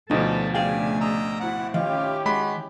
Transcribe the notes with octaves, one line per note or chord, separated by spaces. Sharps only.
D2 B2 F3 D4 D#4 A4
C#3 A3 D4 G#4 F5 G5 G#5
D#5 A#5 E6
C4 E4 F#4 F#5
D#3 C#4 E4 F4 G4 F5
G#3 F#4 B5